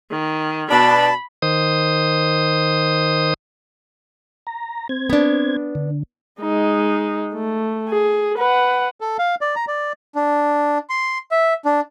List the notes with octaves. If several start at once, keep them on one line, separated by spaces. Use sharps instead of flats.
D#3
B2 D4 A5 B5
D#3 C5 D#6
A#5
C4 G#6
B3 D4
D3
G#3 D#4
A3
G#4
B4 F#5
A4
F5
D5
A#5
D5
D4
C6
E5
D4